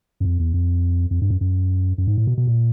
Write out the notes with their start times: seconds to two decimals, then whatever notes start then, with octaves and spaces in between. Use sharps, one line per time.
0.20 F#2
0.25 F2
0.39 E2
0.54 F2
1.11 F2
1.22 G2
1.30 F#2
1.41 F#2
1.98 F#2
2.07 G#2
2.18 A2
2.27 B2
2.38 B2
2.47 A#2